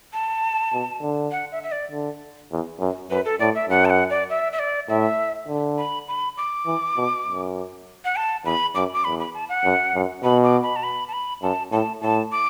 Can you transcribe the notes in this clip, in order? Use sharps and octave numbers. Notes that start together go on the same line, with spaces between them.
A5
B2
D3
F#5
E5
E5
D5
D3
E2
F#2
F#2 B4
A4
A2 D5
E5
F#2 F#5
A5
F#5
D5
E5
E5
D5
A2 E5
D3
B5
B5
D6
E3
B2
F#2
F#5
A5
E2 B5
F#2 D6
D6
E2 B5
B5
A5
F#5
F#2
F#2
B2 B5
D6
B5
A5
B5
A5
B5
F#2 A5
A2 A5
A2 A5
D6